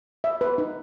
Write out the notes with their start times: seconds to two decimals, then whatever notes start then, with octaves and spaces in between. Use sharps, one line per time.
0.24 E5
0.41 B4
0.58 D#4